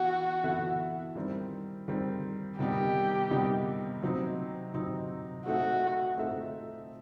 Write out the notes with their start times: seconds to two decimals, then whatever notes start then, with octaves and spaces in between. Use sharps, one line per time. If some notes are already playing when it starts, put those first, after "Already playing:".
Already playing: E3 B3 E4 F#4 E5
0.43 E3 B3 E4 A4 E5
1.15 D#3 G3 C4
1.88 D#3 G3 C4
2.58 C3 D#3 G3 B3 D#4 G4
3.31 C3 D#3 G3 B3 D#4
4.02 C3 F#3 C4 D#4
4.74 C3 F#3 C4 D#4
5.46 A3 C4 D#4 F#4 A4 E5
6.18 A3 C4 D#4 A4 E5